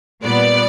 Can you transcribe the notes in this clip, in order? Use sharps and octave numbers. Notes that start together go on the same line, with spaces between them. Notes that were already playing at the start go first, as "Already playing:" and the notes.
A#2 G3 B3 D5